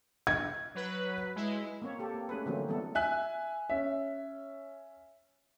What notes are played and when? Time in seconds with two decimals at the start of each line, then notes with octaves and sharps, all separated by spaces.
0.27 G#6
0.75 F#3 B4
1.36 G#3 E4
1.82 A#3 C4 C#5
1.99 A#3 G4 A4
2.14 A#3
2.29 A3 C#4 G#4 B4
2.46 D3 E3 F#3 A3 A#3 C4
2.68 E3 G3 A3 B3 A4
2.95 E5 G#5 F#6
3.70 C#4 E5